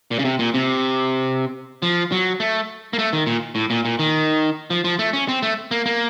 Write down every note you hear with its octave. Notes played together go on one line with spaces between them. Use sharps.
A#2
C#3
C3
A#2
C3
F3
F#3
A3
A#3
A3
D#3
A#2
A2
A#2
A#2
D#3
F3
F3
A3
C#4
C4
A3
A#3
A#3